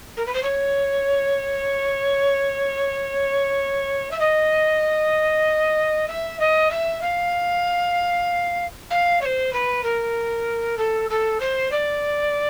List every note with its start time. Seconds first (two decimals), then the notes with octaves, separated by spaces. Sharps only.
0.17 A#4
0.26 B4
0.34 C5
0.43 C#5
4.11 E5
4.20 D#5
6.08 E5
6.40 D#5
6.71 E5
7.01 F5
8.91 F5
9.21 C#5
9.25 C5
9.53 B4
9.84 A#4
10.78 A4
11.10 A4
11.40 C5
11.72 D5